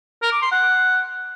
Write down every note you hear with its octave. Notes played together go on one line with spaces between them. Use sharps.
A#4
D6
C6
F#5